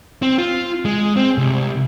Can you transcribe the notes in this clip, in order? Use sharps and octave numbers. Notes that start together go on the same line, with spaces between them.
C4
F4
G#3
C4
C2